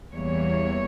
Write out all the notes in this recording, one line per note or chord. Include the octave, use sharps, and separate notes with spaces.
E2 E3 G3 A#3 C#5